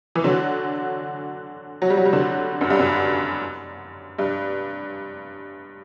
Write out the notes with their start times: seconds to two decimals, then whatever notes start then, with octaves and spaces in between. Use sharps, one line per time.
0.15 E3
0.24 D3 F#3
1.82 F#3
1.90 G3
1.97 F#3
2.05 G3
2.13 D3 F#3
2.61 F#2
2.70 G2
2.79 F#2
4.19 G2